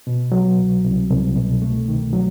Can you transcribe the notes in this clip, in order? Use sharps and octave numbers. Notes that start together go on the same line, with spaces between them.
B2
F#3
C2
C2
C2
B2
A3
D#3
F#3